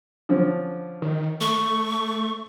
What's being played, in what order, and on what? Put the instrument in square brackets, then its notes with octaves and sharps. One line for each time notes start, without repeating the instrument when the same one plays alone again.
[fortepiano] D3 F3 C#4
[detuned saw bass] D#3
[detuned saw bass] A3 [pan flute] C#6